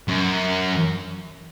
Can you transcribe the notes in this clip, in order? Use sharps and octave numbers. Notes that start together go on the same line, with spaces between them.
F#2